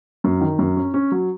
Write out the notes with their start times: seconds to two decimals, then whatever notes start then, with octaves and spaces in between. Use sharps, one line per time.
0.24 F#2
0.41 D#3
0.59 F#2
0.77 C#4
0.94 C#4
1.12 F#3